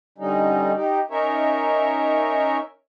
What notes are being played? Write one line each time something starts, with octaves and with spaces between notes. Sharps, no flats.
D3 G3 C#4 D#4
D#4 G4
C#4 D#4 A#4 C#5 E5